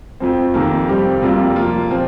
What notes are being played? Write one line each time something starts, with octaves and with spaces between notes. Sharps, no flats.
F2 F3 C4
F2 C3 D#3 A#3
G2 G3 C4 G4
F2 C3 G3 A#3 F4
F3 A#3 F4
A#2 F3 C4